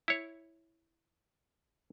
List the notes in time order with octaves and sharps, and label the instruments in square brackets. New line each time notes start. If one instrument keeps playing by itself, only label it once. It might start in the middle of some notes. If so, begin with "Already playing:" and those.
[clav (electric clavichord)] E4 C#5